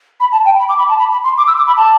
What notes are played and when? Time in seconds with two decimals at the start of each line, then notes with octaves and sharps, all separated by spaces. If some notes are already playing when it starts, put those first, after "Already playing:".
0.20 B5
0.32 A5
0.45 G5
0.59 B5
0.69 D6
0.78 B5
0.89 A5
0.99 B5
1.11 B5
1.24 C6
1.38 D6
1.47 E6
1.57 D6
1.67 B5
1.77 A5